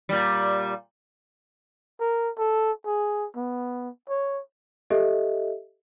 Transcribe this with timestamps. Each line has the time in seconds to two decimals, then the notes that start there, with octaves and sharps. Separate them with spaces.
0.09 A#2 G3
2.00 A#4
2.38 A4
2.86 G#4
3.36 B3
4.09 C#5
4.90 G4 A4 D#5 E5